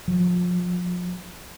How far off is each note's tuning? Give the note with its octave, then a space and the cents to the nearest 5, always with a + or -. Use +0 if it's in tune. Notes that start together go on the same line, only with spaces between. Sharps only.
F3 +30